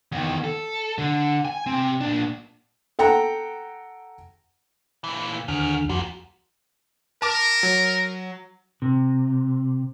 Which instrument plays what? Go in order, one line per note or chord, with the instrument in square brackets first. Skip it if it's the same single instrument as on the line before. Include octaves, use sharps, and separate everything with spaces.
[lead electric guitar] E2 D#3
A4
D3
G#5
C3 C4
A#2 D4
[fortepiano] A4 F#5 G5 A#5
[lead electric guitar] A#2 E3
[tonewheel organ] D#2 D3 F6 [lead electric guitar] F#4 G#4
[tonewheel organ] F2 F#4 [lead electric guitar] A#2 F3
[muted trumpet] A#4 [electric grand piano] A5 D6
[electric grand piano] F#3
[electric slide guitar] C3